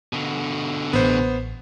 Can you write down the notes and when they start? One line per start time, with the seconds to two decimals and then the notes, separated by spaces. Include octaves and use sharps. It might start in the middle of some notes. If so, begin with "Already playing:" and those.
0.13 B2 D3
0.93 A1 B3 C5